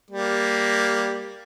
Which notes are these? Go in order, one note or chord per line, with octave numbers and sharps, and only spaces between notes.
G3 A#3